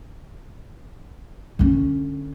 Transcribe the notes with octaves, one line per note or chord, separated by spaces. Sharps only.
D3 C#4